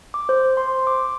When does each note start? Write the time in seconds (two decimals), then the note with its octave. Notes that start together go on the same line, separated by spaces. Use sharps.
0.14 D6
0.29 C5
0.57 C6
0.87 D6